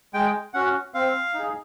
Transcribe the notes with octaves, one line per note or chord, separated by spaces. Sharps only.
G#3 G5
C#4 F#4 F#5
C4 F5
D#4
G#4